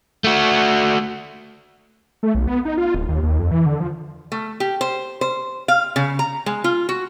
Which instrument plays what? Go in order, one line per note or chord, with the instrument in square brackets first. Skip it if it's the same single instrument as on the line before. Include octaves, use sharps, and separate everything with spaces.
[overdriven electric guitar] A3 F#4
[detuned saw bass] A3
B1
B3
D#4
F4
D1
D#2
D#2
F2
E3
D3
F3
[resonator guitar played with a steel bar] A3
G4
C5
C5
F5
C#3
A#5
G#3
F4
F#4